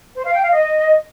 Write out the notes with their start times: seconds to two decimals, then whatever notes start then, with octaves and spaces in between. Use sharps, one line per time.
0.16 C5
0.25 F5
0.33 G5
0.42 F5
0.51 D#5